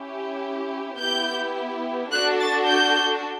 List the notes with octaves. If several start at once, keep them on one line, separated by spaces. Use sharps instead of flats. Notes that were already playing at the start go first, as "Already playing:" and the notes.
Already playing: C#4 E4 G4
B3 E4 G4 G6
D4 F#4 A4 F#6
A6
G6